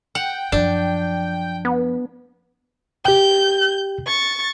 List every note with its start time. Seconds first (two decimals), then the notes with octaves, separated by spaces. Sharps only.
0.15 F#5 G5
0.52 F#2 F3 D4
1.65 B3
3.05 G4 G5 G6
4.07 C#6 A6